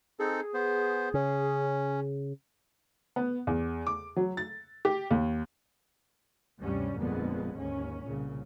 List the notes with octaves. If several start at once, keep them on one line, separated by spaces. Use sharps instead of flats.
C4 D#4 G#4 A4
B3 C5
C#3 C#4
B3
E2
D6
F#3
A6
G4
D#2
D2 G2 C3 G3 C#4
G1 F2 A#2 D3 G#3 B3
D#2 G#2 C#4
C2 A#2 C#3